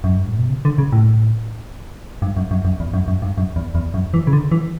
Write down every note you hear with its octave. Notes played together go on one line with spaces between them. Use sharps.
F#2
G2
A2
B2
C#3
D3
C#3
A2
G2
F#2
F#2
F#2
E2
F#2
F#2
G2
F#2
E2
E2
F#2
E3
C#3
D3
E3